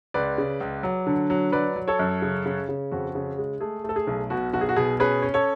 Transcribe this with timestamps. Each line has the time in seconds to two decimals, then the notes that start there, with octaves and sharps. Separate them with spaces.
0.14 C#2 B4 D5
0.38 C#3
0.60 C#2
0.83 F#3
1.07 D3
1.30 F#3
1.52 F#3 B4 D5
1.76 F#3
1.88 A4 C#5
1.99 F#2
2.22 C#3
2.46 C#3
2.69 C#3
2.91 F2 F#4
3.15 C#3
3.38 G#3
3.61 A3 G#4
3.84 A3 A4
3.96 G#4
4.07 B1
4.30 B2 F#4
4.53 B1 F#4
4.61 G#4
4.69 F#4
4.76 B2 G#4
5.00 C#4 G#4 B4
5.22 C#4
5.34 A4 C#5